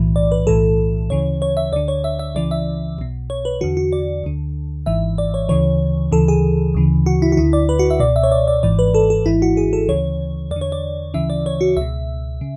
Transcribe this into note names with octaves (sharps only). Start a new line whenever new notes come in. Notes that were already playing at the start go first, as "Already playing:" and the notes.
Already playing: B1 A2 E3
D5
B4
B1 A2 E3 A4
D2 C#3 E3 C#5
C#5
E5
D2 D3 D5
C#5
E5
E5
C#2 C#3 E3 D5
E5
B1 B2
C#5
B4
E2 D3 F#4
F#4
D5
D2 D3
G#1 G#2 E3 E5
D5
C#5
D2 C#3 E3 C#5
D2 C#3 E3 A4
G#4
D2 C#3 E3
F#4
E4
F#4
D2 D3 E4
D5
B4
F#4
E5
C#2 B2 D5
E5
C#5
D5
D5
G#1 G#2 E3 D5
B4
A4
A4
G#1 G#2 E3 E4
F#4
G#4
A4
D2 C#3 E3 C#5
E2 D5
D3
C#5
D5
D2 C#3 E3 E5
D5
C#5
F#4
C#2 B2 E5
C#3